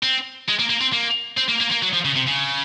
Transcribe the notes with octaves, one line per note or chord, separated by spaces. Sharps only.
C4
G#3
A#3
A#3
C4
A#3
C4
A#3
A#3
A#3
F#3
F3
C#3
C3
C#3